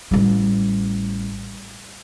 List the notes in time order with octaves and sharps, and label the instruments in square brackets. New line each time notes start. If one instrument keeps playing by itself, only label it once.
[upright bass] A1 G3